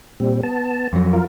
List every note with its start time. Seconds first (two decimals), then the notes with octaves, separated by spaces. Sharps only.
0.20 A#2 G3 C4
0.43 B3 A5
0.93 F2 F#3
1.13 F4 A#4